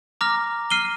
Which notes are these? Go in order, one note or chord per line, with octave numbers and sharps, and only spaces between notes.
A#5 D6 F6 A#6
F6 C7 D#7 G7